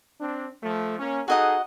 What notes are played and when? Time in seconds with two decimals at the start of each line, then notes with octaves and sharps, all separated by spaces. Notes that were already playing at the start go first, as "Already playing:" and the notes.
0.19 C4 D4
0.62 F3 A3
0.99 A#3 C#4
1.28 D#4 F#4 G#4 A4 D#5 F#5